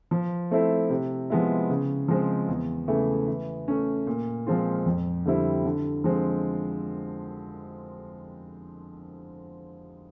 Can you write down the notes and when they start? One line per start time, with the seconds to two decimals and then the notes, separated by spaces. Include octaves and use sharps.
0.11 F3
0.51 A3 C4 E4 A4
0.90 C3
1.30 F3 G#3 B3 E4
1.70 C#3
2.08 F3 G#3 C4
2.48 E2
2.88 C#3 E3 A3
3.28 E3
3.68 A3 C#4
4.07 A#2
4.47 F3 G#3 C4 F4
4.86 F2
5.25 D3 G3 C4 E4
5.65 D3
6.04 F3 G#3 C4